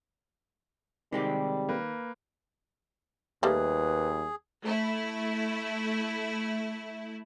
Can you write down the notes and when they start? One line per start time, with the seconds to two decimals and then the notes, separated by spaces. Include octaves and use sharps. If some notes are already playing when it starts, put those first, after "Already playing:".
1.12 C3 D#3 G3 G#3 G4
1.69 A#3 B4
3.43 D#2 G3 A3 A#3 G#4 B4
4.63 A3 E4